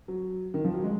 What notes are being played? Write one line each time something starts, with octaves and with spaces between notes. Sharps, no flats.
F#3
D#3
F3
F#3
G#3